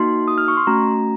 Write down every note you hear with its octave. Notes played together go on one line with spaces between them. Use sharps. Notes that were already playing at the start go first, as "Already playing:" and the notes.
Already playing: A#3 D#4 F#4 C6
D#6
F6
C#6
C6
A3 C#4 F#4 A#5